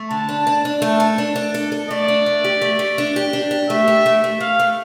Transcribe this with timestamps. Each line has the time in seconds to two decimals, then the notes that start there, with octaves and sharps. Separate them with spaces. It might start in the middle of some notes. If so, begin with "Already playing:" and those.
Already playing: A3
0.10 D3 A5
0.29 D4
0.47 D4
0.65 D4
0.82 A3 A5
1.00 A4
1.18 D4
1.36 D4
1.54 A4
1.72 A4
1.90 A3 D5
2.08 D4
2.26 A3
2.44 G4
2.62 A3
2.79 A3
2.98 D4
3.16 G4
3.33 D4
3.51 G4
3.69 A3 E5
3.88 G4
4.06 A3
4.24 A3
4.40 A3 F5
4.59 A3